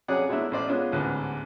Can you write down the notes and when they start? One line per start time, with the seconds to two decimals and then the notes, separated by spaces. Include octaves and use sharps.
0.08 F2 F#3 C#4 G#4 D5 F#5
0.29 F#3 G#3 A3 B3 D4 E4
0.51 A1 A3 C5 D5
0.68 G#3 B3 C#4 D4 F4
0.92 A1 D2 G#2 D3 B3 B4